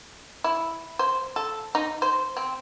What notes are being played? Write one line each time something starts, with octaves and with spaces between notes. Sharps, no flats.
E4
C5
A4
D#4
C5
C4